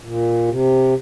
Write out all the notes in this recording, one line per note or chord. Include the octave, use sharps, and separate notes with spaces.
A#2
C3